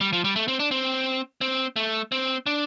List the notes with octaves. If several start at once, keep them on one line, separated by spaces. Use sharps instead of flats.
G3
F3
G3
A3
C4
D4
C4
C4
A3
C4
D4